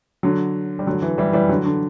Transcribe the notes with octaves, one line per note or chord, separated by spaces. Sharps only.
D3 F#3
G3
D3 F#3
E3
E3 G3
E3 G3
D3 F#3
D3